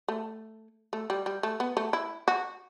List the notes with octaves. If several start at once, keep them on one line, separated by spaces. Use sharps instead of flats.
A3
A3
G3
G3
A3
B3
A3
E4
F#4